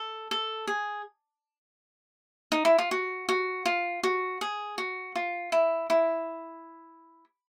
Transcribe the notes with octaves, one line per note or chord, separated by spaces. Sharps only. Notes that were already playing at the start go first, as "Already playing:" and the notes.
Already playing: A4
A4
G#4
D#4
E4
F4
F#4
F#4
F4
F#4
G#4
F#4
F4
E4
E4